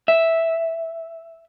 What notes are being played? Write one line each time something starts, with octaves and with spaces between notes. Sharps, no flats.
E5